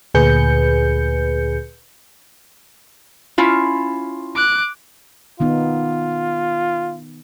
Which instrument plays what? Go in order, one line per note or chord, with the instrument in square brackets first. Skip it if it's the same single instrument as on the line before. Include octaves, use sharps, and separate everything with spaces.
[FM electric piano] D2 A#2 G#4 B4 G6 C#7
[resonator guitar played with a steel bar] C#4 E4 F4
[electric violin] D6 F#6
[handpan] D#3 B3 D#4 [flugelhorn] F4